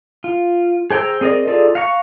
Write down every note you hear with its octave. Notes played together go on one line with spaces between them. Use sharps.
F4
G#4 C5 G5 A#5 E6
C4 G#4 A#4 D5 D#5
D#4 F4 G#4 A4 D5
F5 F#5 A#5 C#6